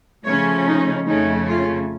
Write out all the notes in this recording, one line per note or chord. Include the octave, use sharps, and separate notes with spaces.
C#3 F3 A3 C#4 C#5
D#4
F2 C#3 A3 C#4 D#4
F4